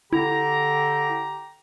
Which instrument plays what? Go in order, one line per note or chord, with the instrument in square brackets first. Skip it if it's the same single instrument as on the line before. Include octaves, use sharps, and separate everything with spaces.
[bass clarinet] D3 [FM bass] E4 [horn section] G4 A#5